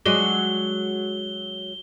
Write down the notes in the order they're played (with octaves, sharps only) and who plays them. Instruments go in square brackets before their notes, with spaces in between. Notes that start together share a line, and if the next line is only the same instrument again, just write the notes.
[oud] F#3 G#3 D4 [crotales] G7